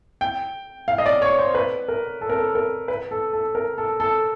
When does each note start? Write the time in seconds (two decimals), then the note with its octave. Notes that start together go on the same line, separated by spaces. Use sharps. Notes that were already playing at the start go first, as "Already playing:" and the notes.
0.21 G5
0.88 F5
0.98 D#5
1.06 D5
1.22 C#5
1.39 C5
1.55 B4
1.88 A#4
2.21 A4
2.30 A#4
2.38 A4
2.55 A#4
2.88 B4
3.11 A4
3.33 A4
3.55 A#4
3.78 A4
4.00 A4